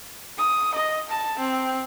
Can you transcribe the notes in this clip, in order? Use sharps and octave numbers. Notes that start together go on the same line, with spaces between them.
D#6
D#5
A5
C4